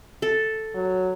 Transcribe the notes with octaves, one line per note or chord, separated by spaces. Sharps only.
A4
F#3